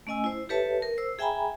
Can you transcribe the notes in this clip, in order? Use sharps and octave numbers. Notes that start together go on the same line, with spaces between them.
A3 C#4 D#5 G#5 E6
E4 C5
G4 A4 B4 C#5 E5 A5
A#4
C5 E6
G#4 E5 G5 G#5 A#5 B5